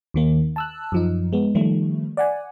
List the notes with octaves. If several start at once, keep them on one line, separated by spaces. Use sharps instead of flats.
D#2 D#3 A#3
A5 E6 F#6
F#2 F3 D#4
G#3 B3
D#3 F3 G3 A3
D5 F#5 G#5